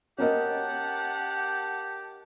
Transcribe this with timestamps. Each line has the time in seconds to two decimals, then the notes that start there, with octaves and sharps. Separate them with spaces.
0.18 C#4 G4 A#4 D#5 F#5 A5